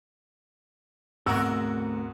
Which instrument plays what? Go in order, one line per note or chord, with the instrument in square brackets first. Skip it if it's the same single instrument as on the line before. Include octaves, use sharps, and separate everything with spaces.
[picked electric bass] D2 A3 C4 [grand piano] G#2 B2 [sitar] F#4 A#4 [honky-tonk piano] E6